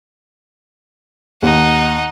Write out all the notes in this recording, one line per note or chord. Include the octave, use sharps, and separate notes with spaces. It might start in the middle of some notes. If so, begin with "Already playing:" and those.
D#2 D#4 F#5